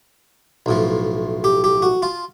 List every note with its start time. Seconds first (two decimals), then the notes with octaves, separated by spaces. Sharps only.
0.66 B1 A2 F3
1.44 G4
1.64 G4
1.82 F#4
2.02 F4